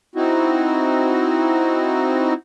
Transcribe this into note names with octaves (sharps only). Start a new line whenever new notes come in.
C4 D#4 E4 F#4